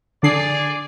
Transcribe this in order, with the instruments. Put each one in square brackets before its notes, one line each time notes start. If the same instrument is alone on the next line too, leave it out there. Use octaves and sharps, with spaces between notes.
[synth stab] D3 D4 C7 [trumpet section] G#4 D5